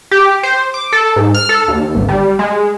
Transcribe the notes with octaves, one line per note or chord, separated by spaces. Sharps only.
G4
C5
D6
A4
G#2
F6
A4
D#2
G#1
G3
G#3